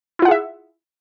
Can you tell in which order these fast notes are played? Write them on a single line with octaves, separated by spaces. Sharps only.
E4 F4 F#5 G#4 E5